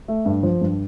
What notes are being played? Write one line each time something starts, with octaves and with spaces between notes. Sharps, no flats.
A3
G2
F3
G2